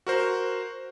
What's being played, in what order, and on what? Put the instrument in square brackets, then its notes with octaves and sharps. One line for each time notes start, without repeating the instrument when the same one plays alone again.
[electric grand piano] F#4 A#4 C5